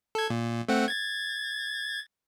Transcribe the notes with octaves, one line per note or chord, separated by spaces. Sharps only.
A4 G#6
A#2
A3 C4 F#5
G#6 A6